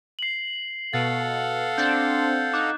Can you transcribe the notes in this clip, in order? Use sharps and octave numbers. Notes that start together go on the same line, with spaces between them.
C7 F#7
B2 A4 F5 F#5 A6
C4 D4 G6 A6
D#4 D6 F#6